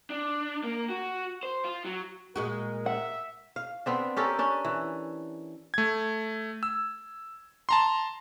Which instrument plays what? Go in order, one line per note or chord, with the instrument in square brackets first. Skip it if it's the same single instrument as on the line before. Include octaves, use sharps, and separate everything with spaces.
[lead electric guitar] D4
A#3
F#4
C5
F4
F#3
[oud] A#2 G#3 F#4 [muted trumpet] A#4
[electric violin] E5 [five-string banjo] F#5
[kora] F5
B3 C4 D4
C#4 G4 A4 A#4
C#4 D4
E3
[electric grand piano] A3 G#6
E6
A5 A#5 C6